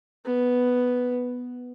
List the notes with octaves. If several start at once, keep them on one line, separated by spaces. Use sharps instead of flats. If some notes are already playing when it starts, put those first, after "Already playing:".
B3